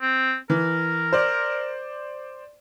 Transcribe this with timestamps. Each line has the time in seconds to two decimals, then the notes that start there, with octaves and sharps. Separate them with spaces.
0.01 C4
0.50 E3 A#4
1.13 C5 D5